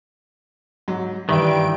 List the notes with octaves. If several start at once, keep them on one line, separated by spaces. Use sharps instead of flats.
G#2 F#3
G2 D#3 E3 G3 B4 E5 D7